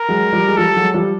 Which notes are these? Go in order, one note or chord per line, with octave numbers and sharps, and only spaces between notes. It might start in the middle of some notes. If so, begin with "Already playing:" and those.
Already playing: A#4
F#3 G#3
F3 G3
G#3
F3 G3 A4
F#3 G#3
F3 G3